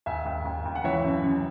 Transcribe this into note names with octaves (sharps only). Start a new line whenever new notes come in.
D#2 E5 G#5
D#2
D#2
D#2
F#5
E3 C#5 E5
F#2
F#2